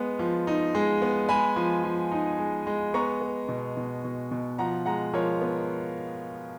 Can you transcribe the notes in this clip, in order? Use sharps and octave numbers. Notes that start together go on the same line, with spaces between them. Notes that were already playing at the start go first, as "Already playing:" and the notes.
Already playing: G#3 B3
F3
D#4
G#3
B3
G#3 G#5 B5
F3
F3
D#4
G#3
G#3
B3 A#5 C#6
B3
B2
B2
B2
B2
F3 F#5 A#5
G#3 F#5 A#5
F3 A#4 C#5
B3